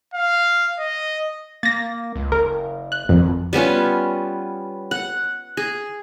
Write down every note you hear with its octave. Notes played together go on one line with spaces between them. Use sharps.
F5
D#5
A#3 A6 A#6
C#2
F#1 A#4
F#6
G#1 F2
G3 B3 C#4 F4
F#5
G#4